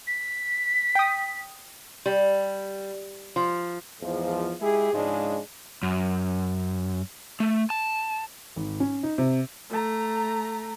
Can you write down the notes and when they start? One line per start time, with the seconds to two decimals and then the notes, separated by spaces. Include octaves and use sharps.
0.07 B6
0.95 G5 D#6
2.06 G3
3.36 F3
4.01 E2 G#2 F3
4.61 G#3 E4 G4 G#4
4.93 G#2 C#3 F3 G#3 D4
5.83 F#2
7.40 A3
7.70 A5
8.56 G#1
8.80 C#4
9.03 D#4
9.18 C3
9.70 A3 A#5